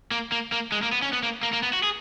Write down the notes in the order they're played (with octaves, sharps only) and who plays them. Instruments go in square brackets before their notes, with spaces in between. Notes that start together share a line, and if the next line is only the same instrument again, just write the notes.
[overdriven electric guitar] A#3
A#3
A#3
G#3
A#3
B3
C#4
B3
A#3
A#3
A#3
B3
F#4
G#4